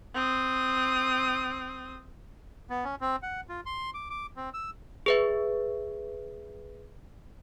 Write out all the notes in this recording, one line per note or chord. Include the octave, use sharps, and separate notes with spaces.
C4 D#6
B3
C#4
C4
F#5
F4
C6
D6
D6
C4
E6
G#4 B4 E5